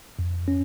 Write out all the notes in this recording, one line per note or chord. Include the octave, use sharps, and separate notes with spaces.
F2
C#4